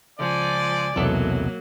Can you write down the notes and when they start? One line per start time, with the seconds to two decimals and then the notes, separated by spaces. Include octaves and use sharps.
0.20 C#2 F3 D5 G#5
0.96 B1 E2 C3 F#3 A#3 A4